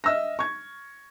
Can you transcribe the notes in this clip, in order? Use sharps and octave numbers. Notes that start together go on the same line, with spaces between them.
D#5 E5 E6 F6 A#6
C#6 G#6